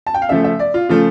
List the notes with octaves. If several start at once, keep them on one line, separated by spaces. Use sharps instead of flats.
A5
G5
F5
C#3 F3 A3 E5
E5
D5
F4
C#3 F3 A3 F4